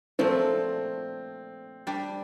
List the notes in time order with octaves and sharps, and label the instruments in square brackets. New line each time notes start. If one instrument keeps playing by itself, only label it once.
[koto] A#2 F3 A3 [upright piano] C4
[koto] G3 D4 G4